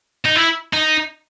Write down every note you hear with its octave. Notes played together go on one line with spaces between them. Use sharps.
D#4
E4
D#4